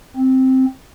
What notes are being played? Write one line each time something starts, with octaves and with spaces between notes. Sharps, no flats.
C4